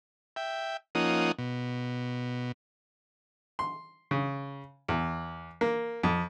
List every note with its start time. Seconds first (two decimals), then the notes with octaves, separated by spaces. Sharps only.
0.36 E5 G5
0.95 F3 A#3 C#4 D#4 F#5 D#6
1.38 B2
3.59 C6
4.11 C#3
4.89 E2
5.61 A#3
6.04 F2